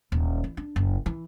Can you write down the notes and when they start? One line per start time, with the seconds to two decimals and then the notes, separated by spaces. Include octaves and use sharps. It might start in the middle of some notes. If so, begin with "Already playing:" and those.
0.12 D#1
0.44 E3
0.57 D4
0.76 F#1
1.06 E3